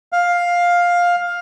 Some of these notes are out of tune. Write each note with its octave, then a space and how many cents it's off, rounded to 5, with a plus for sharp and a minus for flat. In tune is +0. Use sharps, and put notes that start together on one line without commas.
F5 +10